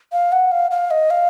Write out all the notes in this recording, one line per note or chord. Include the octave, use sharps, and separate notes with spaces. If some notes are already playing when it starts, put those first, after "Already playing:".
F5
F#5
F5
F5
D#5
F5